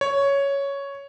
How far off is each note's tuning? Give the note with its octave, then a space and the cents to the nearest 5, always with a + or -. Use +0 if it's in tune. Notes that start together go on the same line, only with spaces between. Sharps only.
C#5 +5